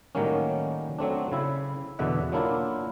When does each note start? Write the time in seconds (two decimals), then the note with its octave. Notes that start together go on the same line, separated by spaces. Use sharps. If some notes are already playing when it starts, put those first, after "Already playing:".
0.15 A2 D#3 F#3 G3 A#3 C#4
0.99 F#3 A3 C4 D4
1.32 C#3 E4 E5
1.99 E2 B2 D3 E5 F#5
2.32 F#3 A#3 D4 E4 F4